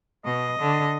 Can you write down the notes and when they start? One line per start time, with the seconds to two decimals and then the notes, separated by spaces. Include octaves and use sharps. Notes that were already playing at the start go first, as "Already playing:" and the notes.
0.25 B2 D#5
0.59 D3